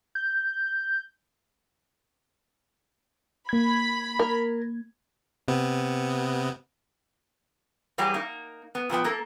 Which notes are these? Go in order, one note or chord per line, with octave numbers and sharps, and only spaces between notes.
G6
A#3 B5 G#6
A#4
C3 B3
E3 F#3 G3 A#3 G4 G#4
A#3 D#4
B3
A#2 F3 B3 G5
A#3 A4 A#4